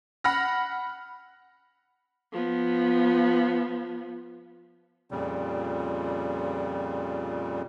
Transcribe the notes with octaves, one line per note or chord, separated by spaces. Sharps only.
F#5 B5 F6 A#6
F3 B3
F2 A#2 C#3 G3